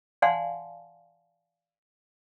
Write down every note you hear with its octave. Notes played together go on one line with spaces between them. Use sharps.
D5 F5 F#5 G#5 A5 C6